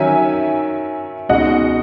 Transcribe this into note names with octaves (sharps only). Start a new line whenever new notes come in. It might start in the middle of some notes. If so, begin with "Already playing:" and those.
Already playing: D#3 F#3 C#4 E5 G#5
C#2 B2 G#3 D#4 D#5 F#5